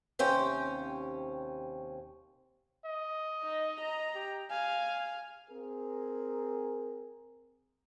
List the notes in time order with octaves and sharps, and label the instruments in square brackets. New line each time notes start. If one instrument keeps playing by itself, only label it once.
[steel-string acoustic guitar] D#2 C3 C#4 C5 G5
[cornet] D#5
[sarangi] D#4
A#5
[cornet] G4
[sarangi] F5 [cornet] G#5
[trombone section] C4 G#4 A#4